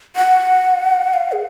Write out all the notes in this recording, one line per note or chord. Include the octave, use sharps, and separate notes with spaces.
F#5
F5
G#4